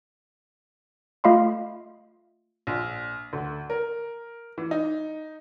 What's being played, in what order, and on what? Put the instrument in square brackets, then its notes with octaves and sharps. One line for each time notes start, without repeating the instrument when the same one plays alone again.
[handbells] A3 F4 D#5 F5 B5 C6
[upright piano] A#1
D2
A#4
E3
D#4